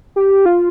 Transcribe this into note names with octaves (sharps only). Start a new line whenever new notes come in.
G4
F4